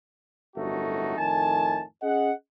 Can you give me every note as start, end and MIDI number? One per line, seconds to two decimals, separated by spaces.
0.56 1.15 31
0.56 1.15 42
0.56 1.15 45
0.56 1.15 57
0.56 1.15 63
0.56 1.15 66
1.18 1.83 41
1.18 1.83 45
1.18 1.83 51
1.18 1.83 80
1.18 1.83 81
2.03 2.32 61
2.03 2.32 68
2.03 2.32 75
2.03 2.32 78